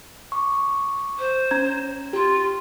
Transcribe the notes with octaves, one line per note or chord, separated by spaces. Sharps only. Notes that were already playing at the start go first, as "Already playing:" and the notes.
C#6 D6
C5
C#4 A#5 G#6
F4 G4